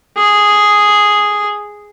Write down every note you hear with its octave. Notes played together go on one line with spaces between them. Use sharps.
G#4